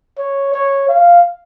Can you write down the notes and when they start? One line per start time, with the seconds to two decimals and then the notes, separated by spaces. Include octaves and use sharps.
0.18 C#5
0.54 C#5
0.89 F5